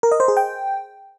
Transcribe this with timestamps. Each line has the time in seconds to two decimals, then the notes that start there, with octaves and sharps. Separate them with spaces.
0.03 A#4
0.12 D#5
0.20 C5
0.28 G#4
0.37 G5